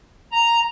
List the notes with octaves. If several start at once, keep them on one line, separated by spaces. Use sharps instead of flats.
A#5